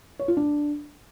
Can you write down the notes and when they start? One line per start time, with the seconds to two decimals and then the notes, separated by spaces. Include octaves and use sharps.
0.19 C#5
0.28 F4
0.37 D4